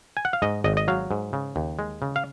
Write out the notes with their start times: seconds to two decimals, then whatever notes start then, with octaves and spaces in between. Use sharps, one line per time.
0.17 G#5
0.25 F#5
0.33 F5
0.42 G#2 D#5
0.64 G#1 D#5
0.77 D#5
0.88 F#3 F5
1.11 G#2
1.33 C#3
1.56 D#2
1.79 G#3
2.02 C#3
2.16 F5